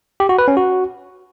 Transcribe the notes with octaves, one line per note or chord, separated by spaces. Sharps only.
G4
F#4
B4
C#4
F#4